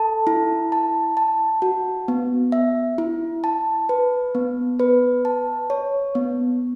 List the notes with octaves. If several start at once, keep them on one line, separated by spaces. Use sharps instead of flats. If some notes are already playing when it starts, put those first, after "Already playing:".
Already playing: A4 A5
E4
A5
A5
F#4
B3
E5
E4
A5
B4
B3
B4
A5
C#5
B3